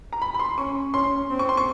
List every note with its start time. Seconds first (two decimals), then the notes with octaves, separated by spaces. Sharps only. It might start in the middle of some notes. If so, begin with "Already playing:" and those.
0.13 A#5
0.22 B5
0.34 B5
0.39 C6
0.58 C#4 C#6
0.94 C#4 C6
1.31 C4
1.39 C#6
1.49 C6
1.57 C#6